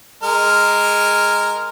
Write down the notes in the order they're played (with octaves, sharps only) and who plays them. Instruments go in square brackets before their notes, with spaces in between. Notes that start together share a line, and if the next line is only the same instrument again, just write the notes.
[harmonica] G#3 A#4 F6